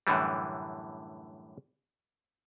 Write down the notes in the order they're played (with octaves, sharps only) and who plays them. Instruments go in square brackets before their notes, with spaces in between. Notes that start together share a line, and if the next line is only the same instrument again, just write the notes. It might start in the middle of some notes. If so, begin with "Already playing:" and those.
[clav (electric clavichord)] F#2 A2 D3 E3 G3